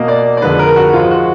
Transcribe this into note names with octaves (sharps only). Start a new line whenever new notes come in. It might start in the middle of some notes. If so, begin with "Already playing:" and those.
Already playing: B2 A#3 D#5
D5
D5
F2 D3 G#3 B4
A#4
F#4
G#2 F3 G#3 F4
F#4